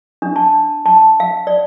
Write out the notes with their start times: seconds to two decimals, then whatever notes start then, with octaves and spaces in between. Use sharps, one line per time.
0.22 D4
0.36 A5
0.86 A5
1.20 F5
1.47 D5